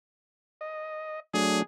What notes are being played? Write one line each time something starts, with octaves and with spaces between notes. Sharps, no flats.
D#5
F#3 A3 D4 G#4